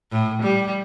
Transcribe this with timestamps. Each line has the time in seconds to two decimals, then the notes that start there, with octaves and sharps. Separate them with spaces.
0.12 A2
0.42 G3